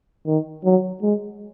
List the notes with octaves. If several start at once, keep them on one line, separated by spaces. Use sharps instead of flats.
D#3
F#3
G#3